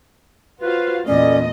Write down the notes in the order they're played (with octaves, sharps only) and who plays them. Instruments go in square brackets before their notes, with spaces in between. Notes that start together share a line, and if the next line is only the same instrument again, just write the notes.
[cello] F4 [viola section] F#4 C5 F5 [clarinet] B4
[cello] E2 A#2 [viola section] A3 B3 D#5 [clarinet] C#4 [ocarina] D5